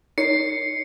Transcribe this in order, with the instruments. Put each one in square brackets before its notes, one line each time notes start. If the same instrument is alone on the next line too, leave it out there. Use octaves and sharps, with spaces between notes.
[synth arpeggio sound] D#4 A#4 C#5 [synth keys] C7 [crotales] C#7